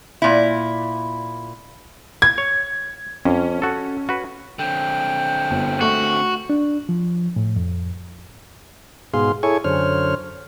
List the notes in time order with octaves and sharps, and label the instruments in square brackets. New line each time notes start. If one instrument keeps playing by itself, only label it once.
[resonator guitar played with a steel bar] A#2 E4
[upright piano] G#6
[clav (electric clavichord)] C#5
[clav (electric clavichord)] F2 [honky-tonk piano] C#4
[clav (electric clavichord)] F#4 A4
F#4 B4
[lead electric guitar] D3 C4 [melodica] G5
[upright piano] G1
[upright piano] A3 C#6 [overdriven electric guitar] F#4
[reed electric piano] D4
F3
A2
F2
[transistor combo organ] G#2 B2 G#4 F5 C6
E4 G#4 A4 C#5 G#5 C#6
F#2 D3 C5 C#5 F6